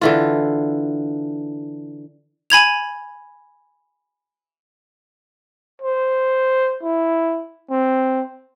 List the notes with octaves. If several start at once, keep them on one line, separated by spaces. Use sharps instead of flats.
D3 E3 F4
G#5 B5 G#6 F7
C5
E4
C4